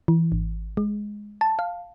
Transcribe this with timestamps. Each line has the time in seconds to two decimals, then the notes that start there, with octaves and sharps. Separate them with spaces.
0.08 E3
0.32 G#1
0.77 G#3
1.41 A5
1.59 F5